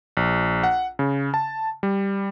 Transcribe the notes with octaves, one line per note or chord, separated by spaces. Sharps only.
A#1
F#5
C#3
A5
G3